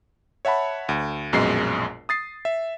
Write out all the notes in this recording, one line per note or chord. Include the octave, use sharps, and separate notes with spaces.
C#5 E5 F#5 A5 B5
D2
A#1 F#2 B2 G#3 C7
D#6 A6 C7
E5